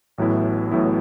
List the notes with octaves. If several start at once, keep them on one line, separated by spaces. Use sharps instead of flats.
A1 A2 F#3 B3 E4
A1 A2 F#3 B3 E4